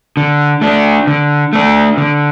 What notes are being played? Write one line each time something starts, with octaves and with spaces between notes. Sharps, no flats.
D3
A3 D4
D3
A3 D4
D3